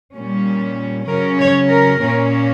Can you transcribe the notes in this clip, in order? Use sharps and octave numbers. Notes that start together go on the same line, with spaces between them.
A#2 G3 C#4
C#3 F#3 C#4 A#4
C#5
A#4
A#2 A#3 C#4